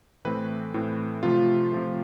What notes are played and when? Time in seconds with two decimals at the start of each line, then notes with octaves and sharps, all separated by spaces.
0.25 A2 E3 A3 C4 B4
0.74 A2 E3 A3 C4
1.23 C3 F3 A3 F4
1.72 C3 F3 A3